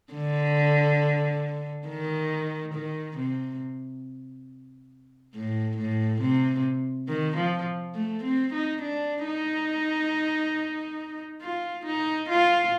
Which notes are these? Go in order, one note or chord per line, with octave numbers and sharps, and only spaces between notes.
D3
D#3
D#3
C3
A2
A2
C3
D#3
F3
A3
C4
D#4
D4
D#4
F4
D#4
F4